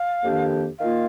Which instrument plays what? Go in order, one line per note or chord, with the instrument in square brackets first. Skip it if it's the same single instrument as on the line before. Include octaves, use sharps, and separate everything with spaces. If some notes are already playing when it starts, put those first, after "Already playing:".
Already playing: [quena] F5
[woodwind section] F2 D#3 A#3 D4 G4
[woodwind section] D#3 A#3 F4 [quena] F5